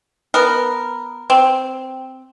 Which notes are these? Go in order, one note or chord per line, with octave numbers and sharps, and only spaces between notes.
B3 A#4
C4